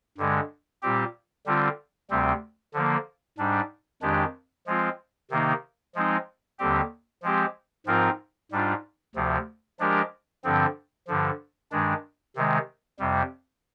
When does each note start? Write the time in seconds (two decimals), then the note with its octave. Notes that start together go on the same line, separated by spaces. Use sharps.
0.18 G2 D3 G#3
0.82 A#2 G3 C4 G4
1.46 D3 G3 C4 F4
2.10 D2 C3 G3 C4
2.74 D3 F3 A#3
3.38 G#2 G3 D4
4.02 F2 D#3 G#3 D4 G4
4.67 F3 G#3 C4 F4
5.30 C3 D#3 A#3 D#4
5.95 F3 G#3 C4 D#4
6.59 D#2 D3 G3 C4 G4
7.23 F3 G#3 C4 G4
7.86 G#2 F3 C4 F4 A#4
8.52 G#2 G3 D4 F4
9.15 D2 C3 F3
9.80 F3 G#3 D4 G4 A#4
10.44 G2 D3 F3 C4
11.08 G2 D3 F3
11.71 G2 D#3 G#3 D4
12.36 C3 D#3 G#3
12.99 F2 C3 G3